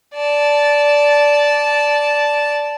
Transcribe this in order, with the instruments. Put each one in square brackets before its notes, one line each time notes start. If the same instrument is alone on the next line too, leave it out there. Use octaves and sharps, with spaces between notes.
[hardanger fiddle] D5 A5